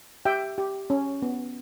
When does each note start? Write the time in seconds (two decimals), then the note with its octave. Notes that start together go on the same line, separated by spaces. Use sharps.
0.25 G4 E5 G5
0.58 G4
0.90 C#4
1.22 B3